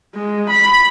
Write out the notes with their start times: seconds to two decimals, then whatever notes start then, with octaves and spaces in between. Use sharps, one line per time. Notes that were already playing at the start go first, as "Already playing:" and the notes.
0.15 G#3
0.49 B5